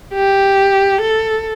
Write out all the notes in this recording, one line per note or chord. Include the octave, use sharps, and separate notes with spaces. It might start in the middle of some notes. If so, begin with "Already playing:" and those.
G4
A4